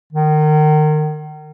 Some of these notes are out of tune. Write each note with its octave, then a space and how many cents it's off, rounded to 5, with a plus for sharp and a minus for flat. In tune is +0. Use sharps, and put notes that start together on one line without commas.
D#3 -30